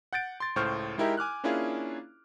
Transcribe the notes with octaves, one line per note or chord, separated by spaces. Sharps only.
F#5 G6 A6 D7
C6 A6
C#2 A2 C5 C#6 F6 G6
G#3 D#4 E4 G4 A#4 E5
G#5 D6 F6 F#6
A#3 C#4 D4 E4 F4 G#4